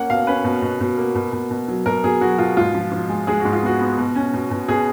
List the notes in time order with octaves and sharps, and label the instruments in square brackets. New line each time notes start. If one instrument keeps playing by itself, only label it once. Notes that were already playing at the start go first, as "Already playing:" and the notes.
Already playing: [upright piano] A#3 C#4 F#5
B2 F5
C#4 B4
B2
B2
B2
A#3
B2
B2
B2
F#3
B2 A#4
B2 G#4
F#3 F#4
B2 F4
G#2 F4
F3
F3
G#3
G#3 G#4
F#4
G#2
F4
B3 F#4
B3
B2
C#4
B2
B2
B2 G#4